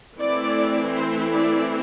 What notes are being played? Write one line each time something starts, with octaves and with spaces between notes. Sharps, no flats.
E3 A3 C4 E4 D5
C5
D5